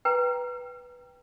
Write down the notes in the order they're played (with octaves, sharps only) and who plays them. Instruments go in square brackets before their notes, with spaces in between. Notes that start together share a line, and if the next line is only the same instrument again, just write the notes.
[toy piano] B4 G5 A#5